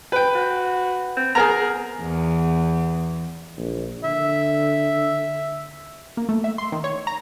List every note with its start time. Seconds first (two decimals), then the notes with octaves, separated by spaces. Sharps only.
0.12 B4 G5
0.35 F#4
1.17 C4
1.35 B3 G#4 A#4 A#5
2.02 E2
3.58 A#1
4.04 D3 E5
6.17 A#3
6.29 A3
6.44 E5
6.58 C6
6.72 D#3
6.84 C#5
7.07 A#5